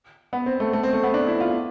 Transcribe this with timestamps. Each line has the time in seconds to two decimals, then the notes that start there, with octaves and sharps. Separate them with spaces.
0.33 B3
0.46 C4
0.60 A3
0.73 A3
0.83 C4
0.93 A3
1.03 B3
1.14 D4
1.27 E4
1.40 F4